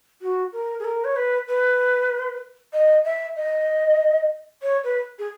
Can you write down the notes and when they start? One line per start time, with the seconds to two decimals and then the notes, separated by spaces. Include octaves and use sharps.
0.22 F#4
0.53 A#4
0.79 G#4
0.84 A#4
1.05 C#5
1.16 B4
1.48 B4
2.73 D#5
3.05 E5
3.36 D#5
4.62 C#5
4.84 B4
5.19 G#4